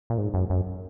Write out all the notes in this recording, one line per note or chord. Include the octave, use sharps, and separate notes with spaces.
A#2
G#2
F#2
F#2